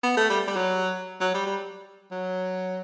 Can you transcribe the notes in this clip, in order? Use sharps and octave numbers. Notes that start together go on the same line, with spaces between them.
B3
A3
G3
G3
F#3
F#3
G3
G3
F#3